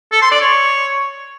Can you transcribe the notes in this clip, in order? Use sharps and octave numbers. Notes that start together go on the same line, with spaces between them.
A4
C6
D5
C#5